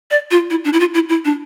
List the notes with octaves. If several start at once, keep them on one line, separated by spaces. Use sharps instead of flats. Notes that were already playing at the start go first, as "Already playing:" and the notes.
D5
F4
E4
D4
E4
F4
E4
E4
D4